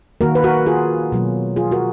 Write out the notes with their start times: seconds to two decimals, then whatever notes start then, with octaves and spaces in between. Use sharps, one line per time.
0.21 D#3 A#3 F#4 A#4
0.35 B4
0.44 F#4 A#4
0.66 F4 G#4
1.12 B2 F#3 A#3
1.56 F4 G#4
1.72 F#4 A#4